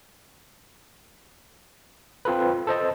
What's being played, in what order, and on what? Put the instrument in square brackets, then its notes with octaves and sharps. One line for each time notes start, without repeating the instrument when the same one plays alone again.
[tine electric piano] C4 F4 A4 B4
A4 C5 D#5 A5